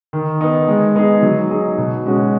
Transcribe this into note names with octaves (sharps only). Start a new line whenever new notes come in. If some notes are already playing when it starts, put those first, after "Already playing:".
D#3
B3 D#4
G#3
B3 D#4 G#4
F#3
D#4 G#4
B2
G#3 C#4 F#4